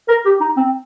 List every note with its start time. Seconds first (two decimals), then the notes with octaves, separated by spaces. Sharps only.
0.08 A#4
0.26 G4
0.41 D#4
0.57 C4